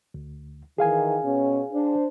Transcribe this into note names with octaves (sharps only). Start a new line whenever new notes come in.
D2
D#3 E3 G#4 F5 G#5
B2 C#4
D4 C5